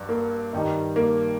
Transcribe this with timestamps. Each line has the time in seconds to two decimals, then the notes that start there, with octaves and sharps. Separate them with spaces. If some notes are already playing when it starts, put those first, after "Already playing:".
Already playing: G2 F#3
0.09 A#3
0.53 G2 D#3 G3
0.96 A#3